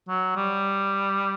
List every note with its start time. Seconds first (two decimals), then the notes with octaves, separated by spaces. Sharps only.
0.09 F#3
0.36 G3